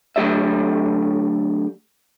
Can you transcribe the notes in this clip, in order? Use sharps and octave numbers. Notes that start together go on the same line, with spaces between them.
D3 F#3 A3 G4 D5 E5